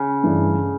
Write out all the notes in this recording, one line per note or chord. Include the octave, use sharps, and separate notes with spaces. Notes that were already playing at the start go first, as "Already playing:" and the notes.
Already playing: C#3
G2 E3 A3 D4